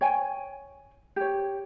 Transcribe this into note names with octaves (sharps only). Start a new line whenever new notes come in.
C#5 G5 G#5
G4 C#5